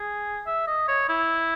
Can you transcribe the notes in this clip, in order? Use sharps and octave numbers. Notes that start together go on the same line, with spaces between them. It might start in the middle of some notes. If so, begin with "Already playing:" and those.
Already playing: G#4
E5
D#5
C#5
E4